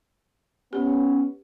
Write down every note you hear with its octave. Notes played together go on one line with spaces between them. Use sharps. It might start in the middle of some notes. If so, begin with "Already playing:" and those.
B3 C#4 G4